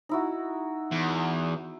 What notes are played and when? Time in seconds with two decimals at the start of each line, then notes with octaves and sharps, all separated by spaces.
0.09 D#4 E4 F#4
0.92 E2